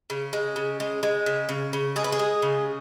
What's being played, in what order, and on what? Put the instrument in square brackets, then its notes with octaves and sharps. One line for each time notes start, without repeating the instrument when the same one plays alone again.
[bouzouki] C#3
G#3
C#3
G#3
G#3
C#3
C#3
C#3
G#3 G#4
B4
G#4
G#3
C#3